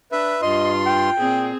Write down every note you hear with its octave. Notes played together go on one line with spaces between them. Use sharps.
D4 B4 E5
G2 F4 D#5 C6
G5
A#2 C4 G#4